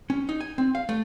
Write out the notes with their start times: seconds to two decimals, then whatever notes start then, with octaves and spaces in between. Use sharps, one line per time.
0.10 C#4
0.29 D#4
0.41 G#5
0.58 C4
0.75 F5
0.89 A3